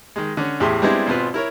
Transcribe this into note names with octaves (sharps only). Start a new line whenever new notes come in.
D#3 G#3
D3 C#4
E2 A2 G4 G#4 E5 C6
G3 G#3 B3 C4 D4 E4
G#1 B2 C4 F4 B4
E4 A#4 C#5